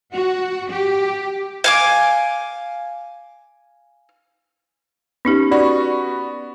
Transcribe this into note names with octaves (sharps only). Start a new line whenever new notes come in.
F#4
G4
F5 G#5 D6
B3 C#4 D#4 G4
B3 F#4 D5 B5 C#6